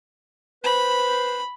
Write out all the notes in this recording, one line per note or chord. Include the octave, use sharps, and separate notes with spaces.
B4 C5 B5